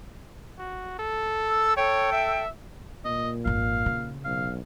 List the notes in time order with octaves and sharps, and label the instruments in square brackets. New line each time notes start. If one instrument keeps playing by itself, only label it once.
[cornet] F#4
A4
[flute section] E6
[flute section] A4 G5 [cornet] C#5
[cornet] E5
[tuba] A#2 [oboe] D#5
[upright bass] G#1 F2 [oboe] F5
[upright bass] C#3
[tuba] B1 [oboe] F5